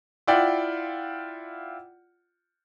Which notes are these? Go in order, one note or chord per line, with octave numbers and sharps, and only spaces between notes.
E4 F4 D5 F#5 G5